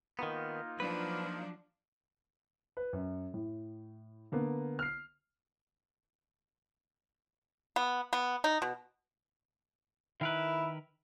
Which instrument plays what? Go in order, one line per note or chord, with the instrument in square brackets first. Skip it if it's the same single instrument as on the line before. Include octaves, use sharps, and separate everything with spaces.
[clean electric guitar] D#3 B3 [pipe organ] A#3 D#4 F4
[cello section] F3 F#3 D4 [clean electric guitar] B4
[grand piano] B4
F#2
A2
D3 A#3 B3
F6 C7
[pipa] B3
B3
D#4
B2
[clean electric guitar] D#3 A#4 B4 [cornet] E4